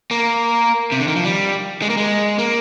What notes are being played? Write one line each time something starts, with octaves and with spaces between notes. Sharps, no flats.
A#3
C3
D3
D#3
F3
G3
G#3
A#3
G#3
A#3